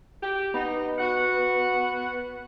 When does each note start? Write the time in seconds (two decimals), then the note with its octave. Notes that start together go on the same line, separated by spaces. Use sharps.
0.21 G4
0.54 B3 D#4
0.99 F#4 F#5